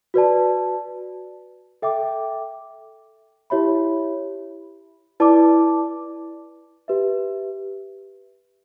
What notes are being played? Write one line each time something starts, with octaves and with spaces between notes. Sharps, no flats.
F#4 B4 D5 A5
A4 E5 G5 D6
E4 G4 C#5 E5 B5
E4 B4 D5 A5 D6
G4 B4 E5